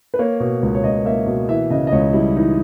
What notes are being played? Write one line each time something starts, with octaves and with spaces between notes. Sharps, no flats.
B4
A#3 C#5
B2
C#2
C#5
C#2 D#5
A#3 E5
B2
E3 E5
C#3 D#5
D#5
C#2 C#5
G3 E4
E3 D#4